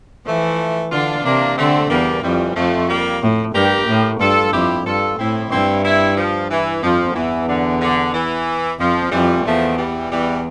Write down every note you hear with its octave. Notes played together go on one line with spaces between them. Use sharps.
E3 F3 A3
D3 D4 F4
C3 A#3 D4
D3 A3 C4
E2 G3 A#3
F2 E3 G3
F2 F3 A3
G3 A#3
A2
G2 G4 A#4
A2
G2 F4 A4
F2 E4 G4
G2 F4 A4
A2 C4 E4
G2 C4 E4
C4 E4
F3
E3
F2 F3
E2 E3
D3
D3
E3
F2 F3
F2 E3 G3
E2 F3 A3
E3 G3
E2 E3 G3